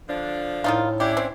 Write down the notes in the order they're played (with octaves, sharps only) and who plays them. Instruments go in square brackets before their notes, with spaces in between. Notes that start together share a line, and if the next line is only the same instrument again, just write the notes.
[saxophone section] D3 F3 D4
[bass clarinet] A2 [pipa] D#3 D#4 F4
[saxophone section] C#4 D4 E4 [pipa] G4
[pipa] C4